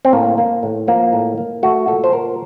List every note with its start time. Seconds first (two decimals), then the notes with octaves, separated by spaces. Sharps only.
0.05 C4
0.13 A2 A#3
0.38 A#3
0.63 A2
0.87 F3 A#3
1.13 A2
1.38 A#3
1.63 A3 F#4
1.87 A#2 A4
2.04 C5
2.12 A#2 A#4